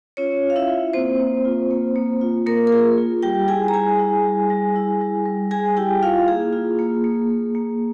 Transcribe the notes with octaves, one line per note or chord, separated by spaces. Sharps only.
C#4 F4 C#5
F4
F5
E4 E5
F4
A#3 C4 C5
A#3
F4
A#3
A#3
F4
A#3 A#4
A#4
F4 G#4
F4
G3 G4 G5
E4 G#4 G#5
A#5
G3 G#4 G#5
E4
G3
G3
E4
G3
G3
G3 G#4 G#5
E4 G4 G5
E4 F4 F5
A#3 G#4
F4
A#3
A#3
A#3
A#3